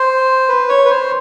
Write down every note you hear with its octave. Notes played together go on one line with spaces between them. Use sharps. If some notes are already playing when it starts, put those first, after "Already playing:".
Already playing: C5
B4
C#5
B4
C5